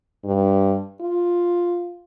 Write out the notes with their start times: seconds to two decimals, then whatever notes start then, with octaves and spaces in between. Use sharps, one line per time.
0.25 G2
1.01 F4